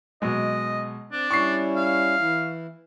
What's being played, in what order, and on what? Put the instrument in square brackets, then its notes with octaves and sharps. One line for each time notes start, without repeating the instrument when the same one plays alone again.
[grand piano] B2 F#3 G#3 [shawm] D#5
[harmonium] C4 [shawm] D4
[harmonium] G3 C#4 E4 [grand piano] C#6 C7
[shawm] F5
[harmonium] E3 E4